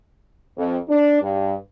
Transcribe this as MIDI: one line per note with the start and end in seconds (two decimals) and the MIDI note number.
0.57 0.77 41
0.89 1.19 62
1.22 1.53 43